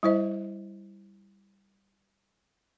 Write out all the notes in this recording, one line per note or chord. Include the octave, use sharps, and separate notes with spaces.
G3 E4 C5 D#5